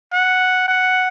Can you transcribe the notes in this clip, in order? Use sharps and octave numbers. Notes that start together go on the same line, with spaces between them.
F#5
F#5